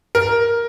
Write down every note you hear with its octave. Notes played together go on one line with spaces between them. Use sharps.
A#4